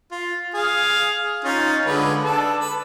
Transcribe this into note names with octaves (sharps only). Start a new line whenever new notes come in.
F4
G#4 F5
C#4 D#4 F4
D3 G#3 B4
D4 A4 A5
B4